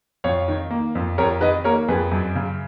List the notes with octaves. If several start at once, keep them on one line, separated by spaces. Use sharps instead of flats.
F2 C#5 F5
D#3
A#3
F2
F2 A#4 C#5
D#3 B4 D#5
A#3 A#4 C#5
F2 G#4 B4
F#2
C#3